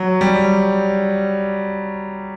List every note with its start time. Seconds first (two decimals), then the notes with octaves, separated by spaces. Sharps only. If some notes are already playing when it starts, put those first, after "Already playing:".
Already playing: F#3
0.21 G3